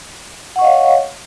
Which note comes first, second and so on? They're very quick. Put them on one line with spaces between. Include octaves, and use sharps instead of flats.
F#5 C#6 D#5 F5 C#5